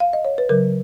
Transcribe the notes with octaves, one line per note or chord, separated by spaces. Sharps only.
F5
D#5
C#5
B4
C#3 F#3 A#4